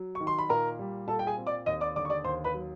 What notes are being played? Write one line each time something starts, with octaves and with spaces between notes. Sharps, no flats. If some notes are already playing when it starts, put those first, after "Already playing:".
Already playing: F#3
C#6
D#3
C6
B5
A#2 A#4 A#5
G3
A#2 A4 A5
G5
G#4 G#5
C4
D5 D6
D#2 D#5 D#6
D5 D6
D3 D5 D6
C#6
D5 D6
D#2 C5 C6
B4 B5
F#3